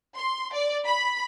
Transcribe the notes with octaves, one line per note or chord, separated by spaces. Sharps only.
C6
D5
B5